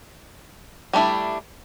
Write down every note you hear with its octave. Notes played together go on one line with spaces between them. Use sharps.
G3 A3 D4 E4